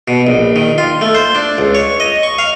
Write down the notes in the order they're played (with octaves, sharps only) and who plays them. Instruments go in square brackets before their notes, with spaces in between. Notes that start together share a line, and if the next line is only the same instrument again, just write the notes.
[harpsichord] B2
A#1
D#3
F4
A3
C5
D4
C#2
C#5
D#5
C#6
F5